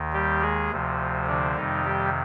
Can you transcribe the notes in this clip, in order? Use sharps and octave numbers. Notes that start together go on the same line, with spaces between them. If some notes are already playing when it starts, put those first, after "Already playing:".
Already playing: D#2 D#3
G3 G4
G#3 G#4
D2 C3 F3
D3 D4
F2 C3 D#3 G3 D#4
G3 G4